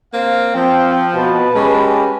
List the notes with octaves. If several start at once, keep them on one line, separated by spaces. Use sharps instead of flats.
A#3 C4 F5
F3 C4 G5
B2 B4 A5
G#3 C#4 F#4 G4